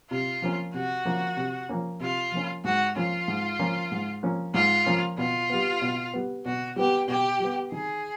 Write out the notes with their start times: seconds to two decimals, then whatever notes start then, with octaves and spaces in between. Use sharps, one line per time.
0.10 C3 F4
0.42 F3 A#3 C#4
0.74 C3 F#4
1.05 F3 A#3 C#4
1.37 C3
1.69 F3 A#3 C#4
2.00 C3 F4
2.32 F3 A#3 C#4
2.64 G#2 F#4
2.96 F3 A#3 C#4 F4
3.28 G#2
3.59 F3 A#3 C#4
3.91 G#2
4.23 F3 A#3 C#4
4.54 G#2 F4
4.86 F3 A#3 C#4
5.18 B2 F4
5.50 G3 B3
5.82 B2
6.14 G3 B3
6.46 B2 F#4
6.76 G3 B3 G4
7.08 B2 G4
7.40 G3 B3
7.72 D#3 G#4